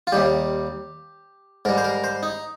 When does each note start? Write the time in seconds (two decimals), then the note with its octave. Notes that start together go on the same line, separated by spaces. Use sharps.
0.07 F4
0.12 D#2 D#3 G3 G4
1.65 G#2 G3 A#4
1.78 C5
1.84 A#4
2.04 C5
2.23 D#4